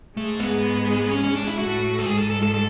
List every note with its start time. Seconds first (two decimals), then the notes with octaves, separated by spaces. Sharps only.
0.17 G#2 G#3 A3
0.40 B3
1.11 C#4
1.24 C#4
1.35 D4
1.47 E4
1.59 A2 A3 F#4
1.99 A4
2.06 G#2 G#3 G#4
2.18 A4
2.30 A4
2.43 A4
2.54 A4